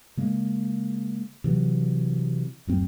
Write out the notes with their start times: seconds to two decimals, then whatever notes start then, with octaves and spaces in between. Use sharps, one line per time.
0.17 C#3 G#3 A#3
1.44 C3 E3 F#3
2.67 D1 F#2 C4